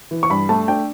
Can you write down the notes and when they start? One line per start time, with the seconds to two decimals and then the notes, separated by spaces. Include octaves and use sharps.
0.11 E3
0.23 C#6
0.30 G2 B5
0.49 A3 A5
0.68 D4 G5